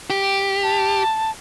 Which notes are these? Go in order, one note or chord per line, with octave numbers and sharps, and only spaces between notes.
G4
A5